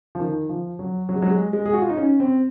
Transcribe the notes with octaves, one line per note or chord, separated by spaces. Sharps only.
F3
D#3
F3
F#3
F#3
G#3
F#3
G#3
G#3
G#4
F#4
F4
D#4
C#4
C4